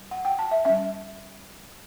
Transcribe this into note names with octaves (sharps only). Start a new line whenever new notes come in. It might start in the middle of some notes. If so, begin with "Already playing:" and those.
Already playing: G3
F#5
G5
A5
E5
G3 C#4 E5